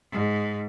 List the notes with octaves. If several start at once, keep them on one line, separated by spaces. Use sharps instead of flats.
G#2